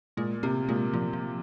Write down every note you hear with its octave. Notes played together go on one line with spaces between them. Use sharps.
A#2 G#3
C3 A#3
A#2 G#3
A#2 F3
F3